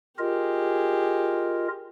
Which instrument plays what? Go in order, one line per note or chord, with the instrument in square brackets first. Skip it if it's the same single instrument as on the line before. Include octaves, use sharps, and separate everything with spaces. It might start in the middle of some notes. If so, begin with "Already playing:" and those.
[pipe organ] F4 A#4 D#5 [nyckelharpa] G4 G#4